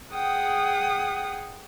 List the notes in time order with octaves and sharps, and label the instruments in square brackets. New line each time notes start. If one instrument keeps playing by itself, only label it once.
[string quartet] G#4 F#5 G5 D#6